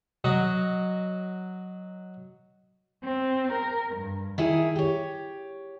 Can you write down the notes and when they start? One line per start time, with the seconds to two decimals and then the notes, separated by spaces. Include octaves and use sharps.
0.24 F#3 F#4 D#5
3.04 C4
3.53 A#4
3.94 G2
4.38 D#3 E4 G#4 A#4
4.76 G4 C#5